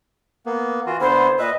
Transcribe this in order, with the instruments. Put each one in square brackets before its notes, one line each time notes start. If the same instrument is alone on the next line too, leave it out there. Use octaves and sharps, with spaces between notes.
[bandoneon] A#3 B3
E3 F4 F#4
[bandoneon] D3 B3 E4 [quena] C5
[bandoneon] A#2 B4 E5 [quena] D#5